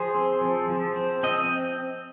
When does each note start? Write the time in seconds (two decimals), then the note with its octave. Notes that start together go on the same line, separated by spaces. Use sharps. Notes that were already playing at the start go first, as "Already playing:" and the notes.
Already playing: F3 G#4 C5
0.15 C4
0.41 F3
0.69 F3
0.96 C4
1.23 C4 D#5